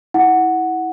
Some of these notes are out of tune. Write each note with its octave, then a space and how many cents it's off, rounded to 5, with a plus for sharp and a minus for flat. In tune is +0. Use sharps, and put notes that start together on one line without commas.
E4 -20 F#5 +0